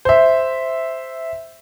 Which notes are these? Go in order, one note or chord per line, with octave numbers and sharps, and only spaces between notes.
C5 E5